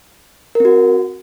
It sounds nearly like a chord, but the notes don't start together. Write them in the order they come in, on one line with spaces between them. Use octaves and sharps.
A#4 C4 F#4